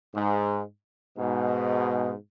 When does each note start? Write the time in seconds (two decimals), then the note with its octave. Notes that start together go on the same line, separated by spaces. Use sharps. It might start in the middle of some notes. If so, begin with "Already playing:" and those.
0.15 G#2
1.18 G#2 B2